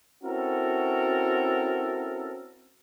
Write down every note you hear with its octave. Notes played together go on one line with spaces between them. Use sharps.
C4 C#4 E4 F#4 A4 A#4